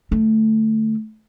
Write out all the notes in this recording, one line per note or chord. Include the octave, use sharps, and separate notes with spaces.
D3 A3